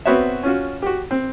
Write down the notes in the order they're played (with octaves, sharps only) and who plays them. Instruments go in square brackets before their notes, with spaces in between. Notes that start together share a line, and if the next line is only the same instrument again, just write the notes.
[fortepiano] B3 C4 F#4 B4 C#5 E5
C#4 F4 F#4
F#4 G4
C4